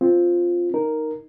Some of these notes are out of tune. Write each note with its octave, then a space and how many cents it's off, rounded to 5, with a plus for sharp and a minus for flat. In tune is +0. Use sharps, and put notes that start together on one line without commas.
C4 +0 F4 +0
D#4 +0 A#4 +0